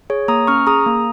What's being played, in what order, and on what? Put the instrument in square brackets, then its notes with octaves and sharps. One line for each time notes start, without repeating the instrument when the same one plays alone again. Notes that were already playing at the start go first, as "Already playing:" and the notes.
[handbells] G#4 C#5
A#3 A#5 D#6
C#4 C#6 F6
G#4 A#5 D#6
A#3